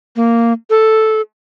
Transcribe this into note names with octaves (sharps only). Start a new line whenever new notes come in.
A#3
A4